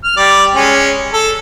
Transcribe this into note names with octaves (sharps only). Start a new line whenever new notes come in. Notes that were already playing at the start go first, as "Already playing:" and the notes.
F6
G3 D5
G#3 C#4
A4